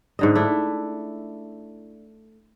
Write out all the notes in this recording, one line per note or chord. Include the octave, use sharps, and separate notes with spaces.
G#2 D3 D#5
A3 D4 E4